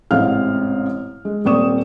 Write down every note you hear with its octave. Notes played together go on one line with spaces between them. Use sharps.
A1 G#2 C3 C4 F5 F6
G#3
D#1 C4 D5 C#6 D#6 E7